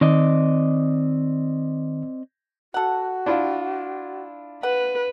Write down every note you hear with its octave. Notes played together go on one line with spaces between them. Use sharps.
D#3 C4 D5 D#5
F#4 A4 F#5
D4 E4 F4
B4 F#5